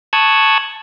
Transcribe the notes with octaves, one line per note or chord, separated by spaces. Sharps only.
A5 C#6 D#6 E6 F#6 G#6